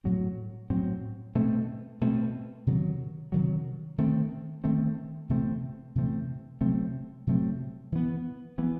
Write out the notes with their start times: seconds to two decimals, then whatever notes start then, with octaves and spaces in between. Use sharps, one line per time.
0.04 A2 F#3 C4
0.70 A2 F#3 C4
1.35 B2 A3 C4
2.01 B2 A3 C4
2.67 C3 D#3 F#3
3.32 C3 D#3 F#3
3.98 D#3 A3 C4
4.64 D#3 A3 C4
5.29 C3 E3 A3 C4
5.95 C3 E3 A3 C4
6.61 C3 F#3 A3 C4
7.27 C3 F#3 A3 C4
7.92 E3 B3
8.58 E3 B3